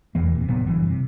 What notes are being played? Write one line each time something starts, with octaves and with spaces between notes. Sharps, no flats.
F1 E2 E3 A#3
D#1 C3
F#1 A#2 F#3 B3
F#1 G2 E3
C3